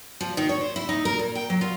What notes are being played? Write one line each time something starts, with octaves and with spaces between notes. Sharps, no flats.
F3
D#3
C#5
C5
E4
D#4
A#4
A#2
G5
F#3
F4